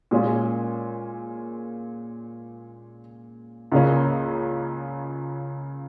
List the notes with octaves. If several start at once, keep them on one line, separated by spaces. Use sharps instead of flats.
A#2 G#3 C#4 F4
C#2 C#3 A#3 C#4